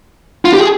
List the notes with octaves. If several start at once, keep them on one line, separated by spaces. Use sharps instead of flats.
F4
G4
G#4